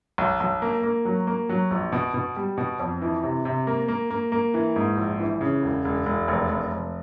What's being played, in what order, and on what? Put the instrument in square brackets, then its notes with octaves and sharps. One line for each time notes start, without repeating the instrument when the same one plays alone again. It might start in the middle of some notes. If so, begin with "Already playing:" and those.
[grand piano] B1
B1
A#3
A#3
F#3
A#3
F#3
A#1
B2
B2
G3
B2
F2
E3
C3
C3
A#3
A#3
A#3
A#3
E3
G#2
A#1
E3
C#3
E1
E1
E1
F1
F1
F1